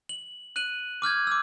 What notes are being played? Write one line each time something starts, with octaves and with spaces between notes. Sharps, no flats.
F#7
F#6 D#7 F#7
D6 F6 G6 G#6
D6 E6